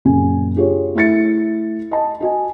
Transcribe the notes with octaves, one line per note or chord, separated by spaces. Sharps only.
F#2 A#2 C#3 G#5
D4 F4 G4 G#4 C#5
A3 E4 A6 C#7
D#5 A5
F#4 D#5 G#5